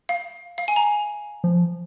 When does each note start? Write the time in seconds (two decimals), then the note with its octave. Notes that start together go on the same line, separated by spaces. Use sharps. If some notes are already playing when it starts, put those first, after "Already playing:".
0.09 F5
0.58 F5
0.68 G#5
0.76 A#5
1.44 F3